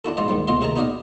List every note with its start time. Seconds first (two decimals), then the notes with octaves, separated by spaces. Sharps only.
0.05 D4 E4 F#4 A4
0.17 G#2 F3 F4 D5 D#5
0.28 D#2 G#2 F3 G3
0.47 D2 B2 F4 D#5 F5 C6
0.61 D#2 C3 G#4 D#5 A5 A#5
0.76 B3 D#4 F#4 D5 D#5 F5